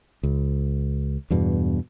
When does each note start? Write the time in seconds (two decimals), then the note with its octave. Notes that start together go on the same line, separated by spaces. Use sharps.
0.23 C#2
1.30 E2 G2 B2